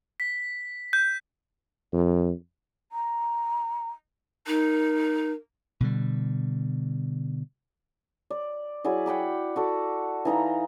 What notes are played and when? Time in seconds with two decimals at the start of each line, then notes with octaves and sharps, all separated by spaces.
0.20 B6
0.93 G6
1.93 F2
2.92 A#5
4.47 D#4 A#4
5.80 B2 D3 G3
8.30 D5
8.85 F#3 E4 G#4 D5
9.06 F#5 G5 B5 D6
9.56 F#4 A4 D5
10.25 E3 D#4 F5 A#5